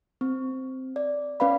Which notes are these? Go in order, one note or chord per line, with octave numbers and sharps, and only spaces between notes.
C4
D5
C#4 B4 D5 F5 B5